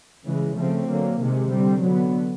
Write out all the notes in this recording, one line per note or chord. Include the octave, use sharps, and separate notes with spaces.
C#3 E3 G#3
C#3 F3 A3 C4
D3 F#3 A#3
C3 D#3 G#3
D3 G3 C4
D3 F#3 B3